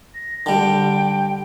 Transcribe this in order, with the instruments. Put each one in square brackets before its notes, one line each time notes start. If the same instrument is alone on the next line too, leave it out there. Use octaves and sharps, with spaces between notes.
[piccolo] A#6
[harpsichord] D3 G3 [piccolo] G5